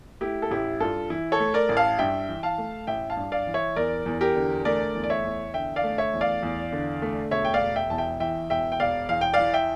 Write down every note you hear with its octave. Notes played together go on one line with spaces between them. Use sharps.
A3 E4 G4
A4
A1 E4 G4
G2 F4 A4
E3 E4
A4 C#5
A3
A#4 D5
A1
F5 A5
G2 E5 G5
E3
F5 A5
A3
A1 E5 G5
F5 A5
G2
D5 F5
E3
C#5 E5
E2 A#4 D5
E2
G4 A#4
D3
A3 A#4 D5
E2
D5
C#5 E5
E2
D3 E5 G5
D5 F5
A3
C#5 E5
E2
D5 F5
E2
D3
A3
E1 C#5 E5
G5
D5 F5
E1
E5 G5
E2 A5
E5 G5
E3 E5 G5
E1 E5 G5
G5
E1 D5 F5
E2 F5
G5
E3 D5 F5
E5 G5